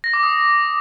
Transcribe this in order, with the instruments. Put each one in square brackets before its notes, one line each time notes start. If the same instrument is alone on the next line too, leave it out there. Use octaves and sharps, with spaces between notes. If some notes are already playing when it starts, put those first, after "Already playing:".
[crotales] A#6
D6
D#6